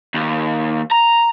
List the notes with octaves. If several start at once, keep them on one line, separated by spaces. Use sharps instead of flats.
D#2
A#5